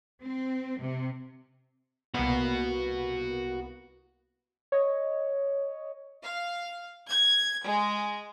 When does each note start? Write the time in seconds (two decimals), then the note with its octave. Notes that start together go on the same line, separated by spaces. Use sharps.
0.22 C4
0.81 C3
2.15 C2 A#3 B3 F#4 B5
4.72 C#5 D#5
6.23 F5
7.09 G#6
7.65 G#3